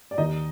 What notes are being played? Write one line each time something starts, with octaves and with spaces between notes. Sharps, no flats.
D5
D#2 D#4 D#5